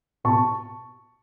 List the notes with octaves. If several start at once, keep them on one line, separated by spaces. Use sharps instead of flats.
B2 A5 C#6